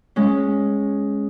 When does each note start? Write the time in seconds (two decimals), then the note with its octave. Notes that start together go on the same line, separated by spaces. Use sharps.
0.16 G#3 C#4